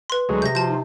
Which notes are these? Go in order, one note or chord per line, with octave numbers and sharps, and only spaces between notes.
B4 C6
D2 F#3 G#3 G#4
C3 G6 A#6
F3 F#4 A5 G6
D#4